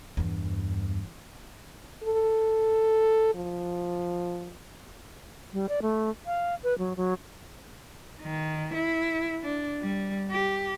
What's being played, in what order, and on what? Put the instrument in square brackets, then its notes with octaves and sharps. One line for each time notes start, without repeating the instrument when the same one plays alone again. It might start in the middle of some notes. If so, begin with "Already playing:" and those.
[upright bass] E2 G2
[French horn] A4
F3
[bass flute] G3
D5
A3
F5
B4
F#3
F#3
[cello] D#3
E4
D4
G3
G4